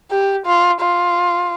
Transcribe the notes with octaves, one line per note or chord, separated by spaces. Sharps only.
G4
F4
F4